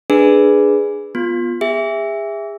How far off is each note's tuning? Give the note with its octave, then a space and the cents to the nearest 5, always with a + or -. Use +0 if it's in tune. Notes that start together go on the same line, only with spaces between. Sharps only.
D4 +0 G#4 +0 B4 +0
B3 -10 F4 +5
G#4 -35 E5 +0